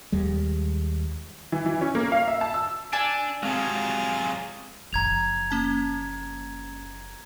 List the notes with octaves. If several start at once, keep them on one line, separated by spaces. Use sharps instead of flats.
D#2 G3 G#3
E3
E3
C#4
A#3
F5
E5
A5
E6
D4 G#5 A5 E6
C3 F#3 G#3 C4 F4 G#4
F#1 F3 A#5 G#6 F7
A#3 C#4 A5